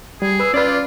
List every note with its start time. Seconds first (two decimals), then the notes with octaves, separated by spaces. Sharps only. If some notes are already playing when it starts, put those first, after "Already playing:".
0.22 G3 G#4
0.40 B4 E6
0.54 C#4 F4 B4 D5